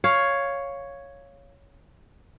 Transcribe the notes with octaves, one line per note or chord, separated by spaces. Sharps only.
C#5 F5